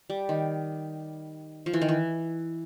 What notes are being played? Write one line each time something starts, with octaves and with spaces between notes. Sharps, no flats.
G3
D#3
F3
E3
D#3
E3